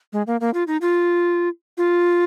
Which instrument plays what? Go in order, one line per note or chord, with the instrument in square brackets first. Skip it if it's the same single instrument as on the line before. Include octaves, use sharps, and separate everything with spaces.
[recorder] G#3
A#3
A#3
F4
D#4
F4
F4